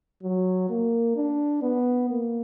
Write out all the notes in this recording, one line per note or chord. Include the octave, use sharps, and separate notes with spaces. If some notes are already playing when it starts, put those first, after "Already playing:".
F#3
A#3
D4
B3
A#3